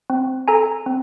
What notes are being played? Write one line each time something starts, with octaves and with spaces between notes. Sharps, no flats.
C4
A4 G#5 A#5
C4